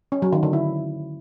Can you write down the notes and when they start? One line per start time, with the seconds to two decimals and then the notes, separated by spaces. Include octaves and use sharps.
0.12 C#4
0.22 F#3
0.33 D#3
0.43 D3
0.53 E4